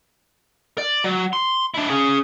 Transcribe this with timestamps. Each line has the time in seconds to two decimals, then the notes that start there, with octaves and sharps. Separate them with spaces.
0.78 D5
1.04 F#3
1.33 C6
1.74 D4 E4
1.89 C#4 G#4